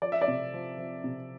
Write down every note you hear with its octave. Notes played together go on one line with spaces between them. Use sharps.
F3 D5
E5
D5
C3
F3
F3
C3